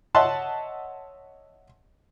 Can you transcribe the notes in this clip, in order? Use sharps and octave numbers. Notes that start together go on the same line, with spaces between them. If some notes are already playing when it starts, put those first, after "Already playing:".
C#5 D#5 E5 F#5 A5 C6